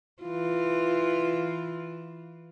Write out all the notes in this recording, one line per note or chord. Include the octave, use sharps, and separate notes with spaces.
E3 F4